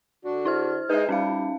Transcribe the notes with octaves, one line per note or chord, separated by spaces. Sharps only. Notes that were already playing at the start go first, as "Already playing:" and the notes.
D3 D4 F#4
E4 C5 F6
G#3 D#4 B4 E5
G3 C#4 D#4 F5